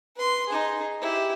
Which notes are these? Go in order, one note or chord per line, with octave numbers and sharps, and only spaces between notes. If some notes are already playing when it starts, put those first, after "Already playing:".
B4 C6
D#4 G#4
E4 G4